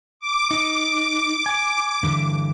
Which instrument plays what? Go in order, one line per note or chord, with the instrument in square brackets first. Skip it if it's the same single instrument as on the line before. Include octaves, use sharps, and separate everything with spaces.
[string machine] D6
[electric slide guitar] D#4
G#5
G2 D3 E3